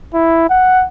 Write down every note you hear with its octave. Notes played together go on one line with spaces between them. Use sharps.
E4
F#5